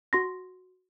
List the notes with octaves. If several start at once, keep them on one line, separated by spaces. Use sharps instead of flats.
F#4 C6 A#6